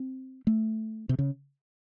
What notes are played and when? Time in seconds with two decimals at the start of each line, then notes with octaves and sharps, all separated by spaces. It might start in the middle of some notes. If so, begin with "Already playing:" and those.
Already playing: C4
0.47 A3
1.09 C3
1.19 C#3